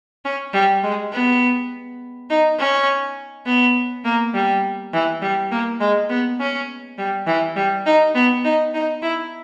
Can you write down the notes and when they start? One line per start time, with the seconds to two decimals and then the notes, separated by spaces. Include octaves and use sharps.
0.25 C#4
0.53 G3
0.83 G#3
1.12 B3
2.30 D#4
2.59 C#4
3.46 B3
4.04 A#3
4.34 G3
4.93 E3
5.22 G3
5.52 A#3
5.80 G#3
6.09 B3
6.40 C#4
6.98 G3
7.27 E3
7.56 G3
7.86 D#4
8.15 B3
8.45 D#4
8.74 D#4
9.02 E4